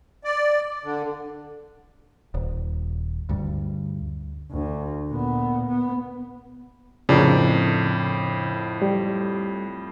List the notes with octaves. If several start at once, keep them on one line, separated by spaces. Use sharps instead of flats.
D5
D3
D#1
D2 G2
D2
A#2 B3
B3
F2 A2 C#3 D4 A#4
G3